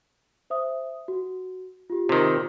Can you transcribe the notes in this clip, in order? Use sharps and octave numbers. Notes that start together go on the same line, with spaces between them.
C5 E5 D#6
F#4
F4 G4
C3 D#3